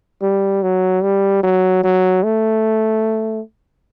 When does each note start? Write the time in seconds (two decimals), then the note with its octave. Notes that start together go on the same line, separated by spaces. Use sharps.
0.22 G3
0.63 F#3
1.03 G3
1.43 F#3
1.83 F#3
2.23 A3